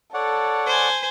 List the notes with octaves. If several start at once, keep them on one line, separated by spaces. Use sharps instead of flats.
A4 C#5 D5 F#5
C5 G#5